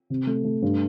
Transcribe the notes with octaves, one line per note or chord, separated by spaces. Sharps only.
C3
A3
A3
G2